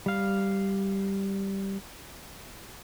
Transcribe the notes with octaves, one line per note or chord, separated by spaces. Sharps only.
G3 F5